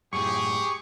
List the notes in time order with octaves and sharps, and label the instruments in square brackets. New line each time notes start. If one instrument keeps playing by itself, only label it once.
[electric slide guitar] F#2 A2 [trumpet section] G4 G#4 [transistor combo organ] C#6